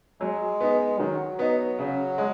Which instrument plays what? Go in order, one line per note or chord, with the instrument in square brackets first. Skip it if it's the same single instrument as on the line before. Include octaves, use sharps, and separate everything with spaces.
[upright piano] F#3 [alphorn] G#3
[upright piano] B3 D#4
[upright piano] D#3 [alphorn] F#3
[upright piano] B3 D#4
C#3
G#3